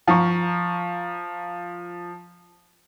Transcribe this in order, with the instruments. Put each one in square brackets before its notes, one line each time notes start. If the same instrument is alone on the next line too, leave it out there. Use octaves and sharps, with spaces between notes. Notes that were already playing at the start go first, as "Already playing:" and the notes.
[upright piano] F3 A#5 C#6